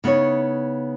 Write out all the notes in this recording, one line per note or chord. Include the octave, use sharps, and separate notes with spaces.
C#3 B3 D#4 E4 C#5